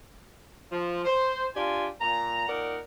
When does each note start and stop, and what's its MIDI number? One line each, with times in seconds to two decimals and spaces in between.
0.70 1.00 53
1.04 1.47 72
1.55 1.87 62
1.55 1.87 65
1.55 1.87 67
1.55 1.87 74
1.55 1.87 80
2.00 2.45 46
2.00 2.45 82
2.47 2.77 46
2.47 2.77 63
2.47 2.77 70
2.47 2.77 74
2.47 2.77 78